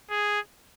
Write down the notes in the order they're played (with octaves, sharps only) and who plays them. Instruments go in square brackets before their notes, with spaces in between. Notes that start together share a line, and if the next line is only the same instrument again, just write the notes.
[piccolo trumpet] G#4